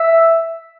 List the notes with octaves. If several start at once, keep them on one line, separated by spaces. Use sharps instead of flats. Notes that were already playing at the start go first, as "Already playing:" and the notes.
Already playing: E5